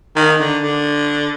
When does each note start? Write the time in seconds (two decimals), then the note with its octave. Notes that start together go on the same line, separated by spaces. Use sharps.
0.16 D#3
0.40 D3
0.63 D3